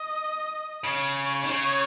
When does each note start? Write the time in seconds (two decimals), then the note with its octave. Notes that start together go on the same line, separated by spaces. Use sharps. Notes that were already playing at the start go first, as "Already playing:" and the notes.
Already playing: D#5
0.84 C#3 C#5
1.43 D#3
1.50 C#3 C#5